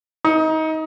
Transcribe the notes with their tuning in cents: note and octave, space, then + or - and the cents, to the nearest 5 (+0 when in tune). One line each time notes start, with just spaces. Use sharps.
D#4 +25